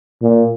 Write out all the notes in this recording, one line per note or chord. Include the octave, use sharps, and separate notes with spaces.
A#2